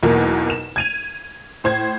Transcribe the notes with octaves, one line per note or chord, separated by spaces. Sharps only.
B1 E2 B2 E3 A#3
E7
G#6 D#7 F7
A2 C5 G#6